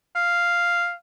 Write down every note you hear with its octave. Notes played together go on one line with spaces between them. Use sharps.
F5